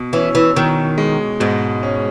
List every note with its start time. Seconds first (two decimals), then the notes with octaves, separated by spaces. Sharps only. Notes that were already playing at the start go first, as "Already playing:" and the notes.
Already playing: B2
0.13 E3 C#4
0.35 E3
0.56 B2 D#3
0.98 G#3
1.40 G#2 B2
1.83 C#4